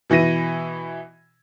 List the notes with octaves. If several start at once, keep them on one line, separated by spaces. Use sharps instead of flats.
B2 E3 E4 A#6 D#7